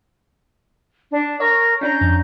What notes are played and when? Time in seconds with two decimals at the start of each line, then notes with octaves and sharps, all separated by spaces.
1.12 D4
1.40 A#4 C#5
1.81 C#4 D4 A#5 G6
2.01 F2